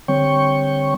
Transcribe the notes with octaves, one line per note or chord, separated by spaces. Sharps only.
D3 G3 C4 C#5 G5 C#6